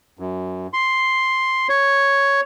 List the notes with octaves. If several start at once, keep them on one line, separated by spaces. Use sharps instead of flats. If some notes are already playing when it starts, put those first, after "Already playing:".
F#2
C6
C#5